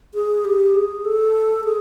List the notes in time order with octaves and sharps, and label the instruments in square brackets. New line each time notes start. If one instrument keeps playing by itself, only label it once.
[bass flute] G#4
G4
G#4
A4
G#4